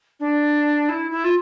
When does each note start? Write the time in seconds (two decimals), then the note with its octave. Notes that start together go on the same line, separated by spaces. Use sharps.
0.20 D4
0.89 E4
1.11 E4
1.24 F4